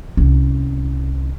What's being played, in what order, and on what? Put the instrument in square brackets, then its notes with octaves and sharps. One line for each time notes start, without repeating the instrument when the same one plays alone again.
[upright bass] C2 C#4